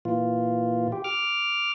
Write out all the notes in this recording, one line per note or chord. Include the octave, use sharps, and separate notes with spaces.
A#2 E3 F4
G4
D6 F6